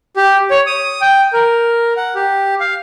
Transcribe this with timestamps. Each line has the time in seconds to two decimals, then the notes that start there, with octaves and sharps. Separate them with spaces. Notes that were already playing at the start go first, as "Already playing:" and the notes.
0.17 G4
0.51 C#5
0.66 D#6
1.01 G5
1.33 A#4
1.97 F#5
2.15 G4
2.60 F5